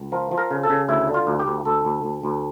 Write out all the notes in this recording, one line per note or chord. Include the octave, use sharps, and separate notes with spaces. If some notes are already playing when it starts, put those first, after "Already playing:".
Already playing: C#2
F3 A#4
F3
A#4
C#3
A4
C#3
D2 E4
D3
F4
D2
G4
D2
D2 A4
D2
D2
D2